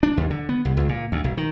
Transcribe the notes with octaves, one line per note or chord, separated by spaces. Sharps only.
D4
D#2
D3
B3
C2
C#2
A#2
D2
B1
D#3